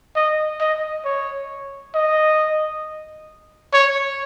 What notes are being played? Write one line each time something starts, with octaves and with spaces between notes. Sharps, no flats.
D#5
D#5
C#5
D#5
C#5